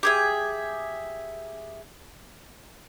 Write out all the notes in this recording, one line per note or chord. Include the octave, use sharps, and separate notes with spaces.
G4 G#4 E5